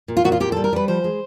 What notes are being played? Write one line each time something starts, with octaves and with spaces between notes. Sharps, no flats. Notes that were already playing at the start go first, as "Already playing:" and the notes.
A#2
F4
A#2 F#4
F4
A#2 G4
G3 A4
A#4
G3 B4
F3 C5
G#3